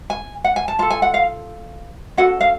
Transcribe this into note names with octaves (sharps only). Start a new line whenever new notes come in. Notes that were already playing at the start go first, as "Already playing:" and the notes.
G#5
F#5
G#5
A5
F4 A4 A5
G#5
F#5
F5
C#4 F#4 A4 F#5
F5